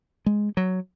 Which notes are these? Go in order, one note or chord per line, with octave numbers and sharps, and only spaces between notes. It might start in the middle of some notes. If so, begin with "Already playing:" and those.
G#3
F#3